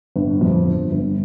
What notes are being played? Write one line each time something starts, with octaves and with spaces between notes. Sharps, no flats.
G1
F2
G1
G1